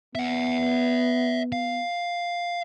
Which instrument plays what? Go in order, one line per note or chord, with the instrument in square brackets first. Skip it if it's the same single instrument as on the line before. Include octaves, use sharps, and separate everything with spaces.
[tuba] B3 [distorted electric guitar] E5 F#5
[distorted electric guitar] F5